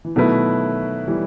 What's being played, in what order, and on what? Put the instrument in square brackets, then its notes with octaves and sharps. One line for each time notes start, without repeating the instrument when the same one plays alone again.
[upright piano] E3
[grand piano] B2 A3 E4 B4 [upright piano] D#3 F#3
[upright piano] E3 G3